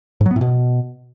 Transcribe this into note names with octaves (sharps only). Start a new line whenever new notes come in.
G#2
F#3
B3
A2
B2